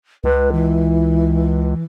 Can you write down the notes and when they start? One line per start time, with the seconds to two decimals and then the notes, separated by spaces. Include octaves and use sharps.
0.24 C#2 B4
0.52 E3